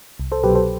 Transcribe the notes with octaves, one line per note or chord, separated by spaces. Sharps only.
C2
A4 C5
B2 F#3 G4 B4
A4 C5